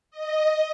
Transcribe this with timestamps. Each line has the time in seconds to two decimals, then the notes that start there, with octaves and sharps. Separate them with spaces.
0.11 D#5